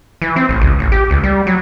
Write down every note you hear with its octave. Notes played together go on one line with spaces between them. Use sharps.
E3
C4
A1
C#2
A1
G4
C#2
G3
F#3